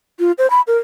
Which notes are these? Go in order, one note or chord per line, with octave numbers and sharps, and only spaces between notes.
F4
C5
B5
A#4